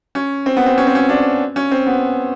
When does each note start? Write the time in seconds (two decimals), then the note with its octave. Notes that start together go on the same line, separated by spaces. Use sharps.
0.15 C#4
0.46 C4
0.57 B3
0.66 C4
0.78 C#4
0.87 C4
0.95 C#4
1.09 D4
1.56 C#4
1.71 C4
1.87 B3